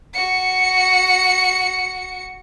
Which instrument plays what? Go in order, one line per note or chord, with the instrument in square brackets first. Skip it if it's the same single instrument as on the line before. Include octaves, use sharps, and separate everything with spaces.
[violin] F#4 C#7